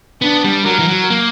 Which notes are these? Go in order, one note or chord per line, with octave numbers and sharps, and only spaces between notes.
B3 D4
G3
F#3 A#4
E3
F#3
A#3